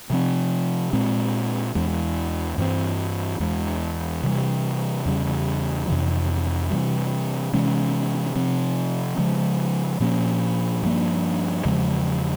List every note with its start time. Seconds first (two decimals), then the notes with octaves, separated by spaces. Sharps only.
0.10 C3 F3 C4
0.93 A#2 G#3 C4
1.75 E2 E3 G#3
2.58 G2 E3 G#3 C4
3.40 E2 E3 G#3
4.23 C3 E3 G3
5.06 E2 C#3 G3
5.88 F2 C3 E3
6.70 C3 E3 G3
7.53 C3 E3 G#3 C#4
8.36 C3 F3 C4
9.18 C#3 F3 G#3
10.00 A#2 F3 A#3 C#4
10.83 G2 F3 A#3
11.65 E2 C#3 F3 G#3